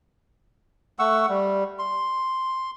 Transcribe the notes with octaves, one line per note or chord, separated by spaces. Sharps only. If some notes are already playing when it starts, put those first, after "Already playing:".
A3 F#5 C#6 E6
G3
C6